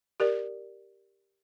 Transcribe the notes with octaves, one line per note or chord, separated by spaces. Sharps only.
G4 A#4 D5